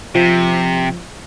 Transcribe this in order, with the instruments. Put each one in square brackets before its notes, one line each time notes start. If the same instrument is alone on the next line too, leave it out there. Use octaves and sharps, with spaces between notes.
[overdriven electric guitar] C3 [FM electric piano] F3